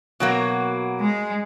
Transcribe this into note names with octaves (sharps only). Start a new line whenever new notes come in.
B2 F#3 A#3
G#3